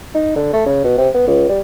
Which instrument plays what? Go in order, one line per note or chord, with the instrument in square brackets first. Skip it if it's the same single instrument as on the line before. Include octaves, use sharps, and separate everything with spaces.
[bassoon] D#4
D3
A3
C#3
B2
C3
B3
C#2
G3